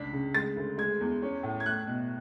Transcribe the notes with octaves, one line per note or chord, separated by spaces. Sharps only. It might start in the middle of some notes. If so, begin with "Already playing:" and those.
Already playing: C#2 D4 B6
C#3
G#3 A6
D2
G#3 G#6
E2
C#4
A2
G#6
A3 F#6
B2